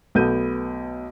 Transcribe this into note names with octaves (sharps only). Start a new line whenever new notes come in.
B1 A3 B3 G6 D#7